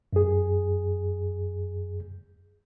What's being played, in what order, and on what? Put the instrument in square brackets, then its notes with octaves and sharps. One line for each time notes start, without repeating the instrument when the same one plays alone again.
[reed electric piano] F#2 G#4